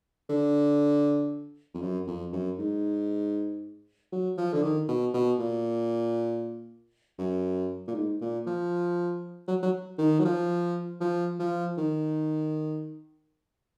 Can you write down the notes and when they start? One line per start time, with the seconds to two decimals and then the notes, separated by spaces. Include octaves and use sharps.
0.30 D3
1.74 F2
1.82 F#2
2.07 F2
2.33 F#2
2.59 G#2
4.13 F#3
4.38 F3
4.53 D3
4.63 D#3
4.89 B2
5.14 B2
5.39 A#2
7.19 F#2
7.88 A#2
7.95 G#2
8.21 A#2
8.47 F3
9.48 F#3
9.63 F#3
9.99 D#3
10.20 F#3
10.25 F3
11.01 F3
11.39 F3
11.78 D#3